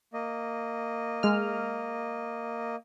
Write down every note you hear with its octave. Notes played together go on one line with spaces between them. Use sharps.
A#3 D#5
G#3 F6